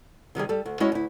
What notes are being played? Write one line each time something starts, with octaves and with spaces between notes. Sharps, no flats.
C3 D#3 G3 G#4
G3 A4
D2
G#3 C#4 E4 F#4 C#5 D#5
D2 E4